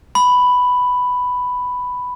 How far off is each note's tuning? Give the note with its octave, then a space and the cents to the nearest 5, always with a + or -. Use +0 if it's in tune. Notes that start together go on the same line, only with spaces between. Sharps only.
B5 +5